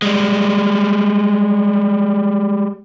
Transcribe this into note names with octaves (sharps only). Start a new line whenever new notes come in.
G3 G#3